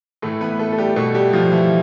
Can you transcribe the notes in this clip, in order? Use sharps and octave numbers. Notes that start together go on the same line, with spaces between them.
A2 E3 A3 A4
B3 B4
A3 A4
A4
G3 G4
B2 A3 A4
G3 G4
F3 F4
E3 E4